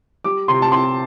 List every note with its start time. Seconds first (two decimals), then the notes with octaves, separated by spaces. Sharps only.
0.24 G3 D6
0.48 C3 C6
0.62 A5
0.72 C4 C6